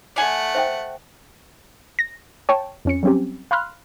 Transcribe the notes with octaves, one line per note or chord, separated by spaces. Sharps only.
A3 D5 F#5 G#5
C5 E5 G5
A#6
C#5 G5 A5 C#6
F2 C#4 C#7
F#3 G3 C4 C#4 G4
F5 B5 C6 F6 F#6